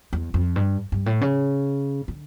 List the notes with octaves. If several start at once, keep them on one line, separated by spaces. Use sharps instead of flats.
E2
F2
G2
G2
A2
C#3
D3